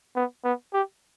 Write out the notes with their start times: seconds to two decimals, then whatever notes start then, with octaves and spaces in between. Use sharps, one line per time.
0.16 B3
0.44 B3
0.73 G4